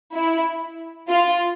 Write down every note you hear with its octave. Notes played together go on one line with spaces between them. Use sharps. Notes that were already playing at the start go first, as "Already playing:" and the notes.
E4
F4